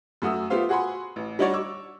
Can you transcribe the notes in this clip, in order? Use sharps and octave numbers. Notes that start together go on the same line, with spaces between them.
F#2 A3 F#4 D#6 E6
A3 B3 F4 G4 C5 F5
F#4 G#4 F#5 G#5 B5 C6
A1
G3 D4 D#4 F#4 C#5 D5
C#6 D6 E6